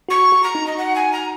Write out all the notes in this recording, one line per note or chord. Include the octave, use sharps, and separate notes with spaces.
F#4 C#6
F#4
A#5
D#4
D#5
F#5
G#5
A#5